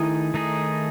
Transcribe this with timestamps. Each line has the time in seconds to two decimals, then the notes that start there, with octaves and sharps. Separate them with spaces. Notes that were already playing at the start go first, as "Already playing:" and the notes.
Already playing: D#3 A3 D#4 E4 G#4
0.34 D#3 A3 D#4 G#4